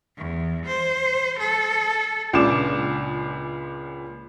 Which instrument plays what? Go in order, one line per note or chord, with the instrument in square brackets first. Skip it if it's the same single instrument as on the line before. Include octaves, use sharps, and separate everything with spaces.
[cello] E2
C5
A4
[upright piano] C#2 A#2 C#3 D4 D6 E7